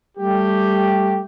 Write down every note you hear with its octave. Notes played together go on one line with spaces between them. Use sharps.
G3 A3 G4